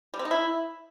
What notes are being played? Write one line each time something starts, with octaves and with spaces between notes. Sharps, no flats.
G3
C4
D#4
E4